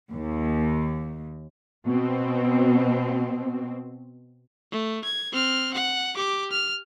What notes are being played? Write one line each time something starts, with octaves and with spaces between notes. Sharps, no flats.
D#2
B2 C4
A3
G#6
C4 F6
F#5
G4 D6
F6